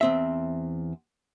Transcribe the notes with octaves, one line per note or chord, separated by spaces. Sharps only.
E2 C4 E5